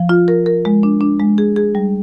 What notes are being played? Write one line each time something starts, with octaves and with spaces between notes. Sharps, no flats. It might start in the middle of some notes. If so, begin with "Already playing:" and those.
Already playing: F3
F4
A#4
A#4
G#3
D4
D4
G#3
G#4
G#4
G3